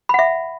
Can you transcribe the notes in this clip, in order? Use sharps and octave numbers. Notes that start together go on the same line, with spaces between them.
E5 F#5 B5